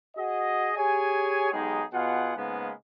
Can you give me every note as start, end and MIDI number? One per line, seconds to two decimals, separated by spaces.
0.16 0.71 66
0.16 0.71 68
0.16 0.71 75
0.76 1.49 67
0.76 1.49 68
0.76 1.49 73
0.76 1.49 80
1.51 1.81 35
1.51 1.81 56
1.51 1.81 63
1.51 1.81 67
1.51 1.81 68
1.93 2.31 47
1.93 2.31 65
1.93 2.31 68
1.93 2.31 78
2.35 2.71 44
2.35 2.71 49
2.35 2.71 56
2.35 2.71 58
2.35 2.71 59